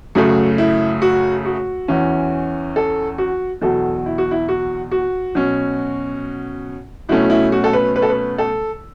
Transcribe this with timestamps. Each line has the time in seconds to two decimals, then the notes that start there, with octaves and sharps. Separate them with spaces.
0.15 F#2 C#3 F#3 A3 F#4
0.58 E4
1.02 F#4
1.45 F#4
1.88 E2 E3 C#4
2.76 A4
3.18 F#4
3.61 E2 B2 F#3 A4
4.06 E4
4.18 F#4
4.31 E4
4.48 F#4
4.91 F#4
5.35 B2 F#3 C#4
7.09 B2 F#3 A3 C#4 E4
7.30 E4
7.52 F#4
7.64 A4
7.73 B4
7.96 B4
8.02 A4
8.09 B4
8.38 A4